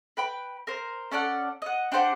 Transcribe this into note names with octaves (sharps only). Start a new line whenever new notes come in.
B4 G5 B5
A#4 C5
C#4 A4 D5 F#5
D#5 F#5
D4 G4 C5 F#5